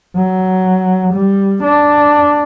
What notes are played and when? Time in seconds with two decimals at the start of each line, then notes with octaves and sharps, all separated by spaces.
0.16 F#3
1.13 G3
1.63 D4